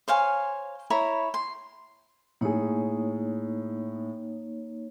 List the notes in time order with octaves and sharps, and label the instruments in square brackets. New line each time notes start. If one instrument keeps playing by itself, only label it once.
[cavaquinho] C5 C#5 F5 G#5
E4 C#5 A#5 B5
C6
[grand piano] A2 G#4 [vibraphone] A#3 D#4 C#5